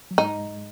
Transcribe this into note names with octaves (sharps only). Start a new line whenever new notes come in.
F#3
G#2 G#3 D#4